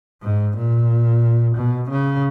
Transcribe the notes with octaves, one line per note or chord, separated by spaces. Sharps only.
G#2
A#2
B2
C#3